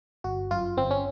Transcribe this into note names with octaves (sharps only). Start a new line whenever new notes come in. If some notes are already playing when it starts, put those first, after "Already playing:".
G1 F#4
F#2 F4
G1 C4
C#4